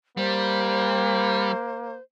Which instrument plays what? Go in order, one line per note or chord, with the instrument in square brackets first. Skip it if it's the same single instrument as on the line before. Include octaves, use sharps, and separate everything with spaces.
[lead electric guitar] G3 [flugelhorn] A#3 [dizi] C5